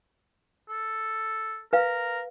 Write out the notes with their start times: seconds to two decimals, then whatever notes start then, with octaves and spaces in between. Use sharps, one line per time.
0.69 A4
1.73 A#4 B4 F5